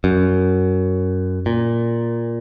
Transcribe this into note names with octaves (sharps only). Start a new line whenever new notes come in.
F#2
A#2